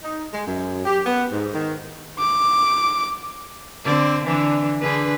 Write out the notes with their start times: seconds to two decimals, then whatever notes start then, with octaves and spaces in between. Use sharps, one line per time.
0.03 D#4
0.33 G#3
0.45 F#2
0.85 G4
1.05 B3
1.32 G#2
1.53 D#3
2.19 D6
3.85 D3 C4 D5
4.25 D3 E3 D4
4.82 D3 G#4 B4